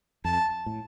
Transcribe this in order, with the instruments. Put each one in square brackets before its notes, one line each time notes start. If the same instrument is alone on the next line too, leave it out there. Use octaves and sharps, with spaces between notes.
[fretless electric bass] F2 [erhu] A5
[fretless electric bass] A2